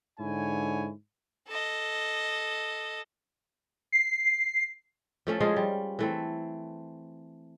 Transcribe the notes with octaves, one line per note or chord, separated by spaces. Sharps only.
G#2 D3 E4 C#5 G#5
A4 D#5
C7
F3 A3 C#4
F3 G#3 F4 G#4
G3
E3 A3 C4